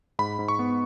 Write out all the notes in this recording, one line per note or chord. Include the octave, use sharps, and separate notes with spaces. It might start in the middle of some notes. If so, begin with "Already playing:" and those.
G#2 B5
G#2
C#6
B3